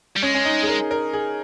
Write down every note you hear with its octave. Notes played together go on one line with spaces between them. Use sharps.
G3
G#3 C#4
C#4
D#4
G#4
A#4
A#4
G#4